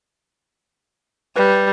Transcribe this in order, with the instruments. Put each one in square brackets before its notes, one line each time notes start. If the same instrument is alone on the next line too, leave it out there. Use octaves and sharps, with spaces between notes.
[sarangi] G3 [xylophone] B4